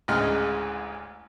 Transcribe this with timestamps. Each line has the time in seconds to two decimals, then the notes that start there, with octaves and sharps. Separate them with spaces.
0.08 A1 D2 C#3 G#3 F6